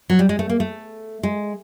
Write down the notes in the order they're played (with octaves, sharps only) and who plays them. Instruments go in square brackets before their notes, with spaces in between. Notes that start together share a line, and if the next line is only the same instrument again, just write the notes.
[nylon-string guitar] F#3
G3
G#3
A3
A#3
A3
G#3